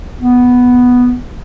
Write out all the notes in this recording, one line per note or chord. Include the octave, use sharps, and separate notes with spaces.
B3